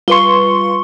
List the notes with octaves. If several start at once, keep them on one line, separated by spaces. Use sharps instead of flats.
G3 F4 B4 C6 C#6 C#7 G7